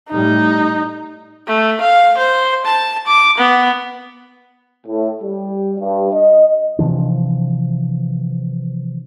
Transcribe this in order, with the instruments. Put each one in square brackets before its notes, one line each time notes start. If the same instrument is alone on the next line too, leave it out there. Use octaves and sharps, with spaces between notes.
[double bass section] A2 G3 [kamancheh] D#4
[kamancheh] A3
F5
C5
A5
D6
B3
[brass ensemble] A2
G3
G2
D#5
[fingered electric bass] C3 E3 F3 D4